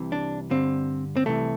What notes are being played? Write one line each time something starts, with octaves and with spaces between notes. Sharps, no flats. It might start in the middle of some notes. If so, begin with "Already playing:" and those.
Already playing: C2 C3 E3
D4
G2 D3 C4
C4
C2 C3 E3 A3